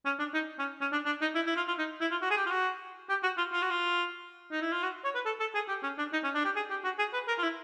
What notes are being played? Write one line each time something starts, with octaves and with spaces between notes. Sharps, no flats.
C#4
D4
D#4
C#4
C#4
D4
D4
D#4
E4
E4
F4
F4
D#4
E4
F4
F#4
G#4
G4
F4
F#4
G4
F#4
F4
F4
F#4
F4
D#4
E4
F4
F#4
C#5
B4
A4
A4
G#4
G4
C#4
D4
D#4
C#4
D4
G4
G#4
G4
F#4
G#4
B4
A#4
F4
E4